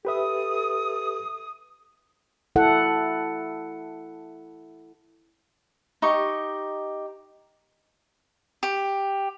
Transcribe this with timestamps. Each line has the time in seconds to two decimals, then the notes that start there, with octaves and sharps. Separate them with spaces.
0.05 G4 A4 B4 E5 D#6
2.56 E4 A4 F#5
6.02 D#4 G4 C#6
8.63 G4